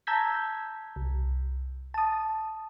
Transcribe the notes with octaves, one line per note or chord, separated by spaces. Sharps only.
A5 A#5 E6 G6 G#6 B6
C2
A5 D#6